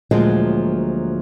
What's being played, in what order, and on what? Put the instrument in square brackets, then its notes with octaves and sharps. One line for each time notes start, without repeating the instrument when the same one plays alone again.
[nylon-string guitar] D2 A#2 F3 F#3 G#3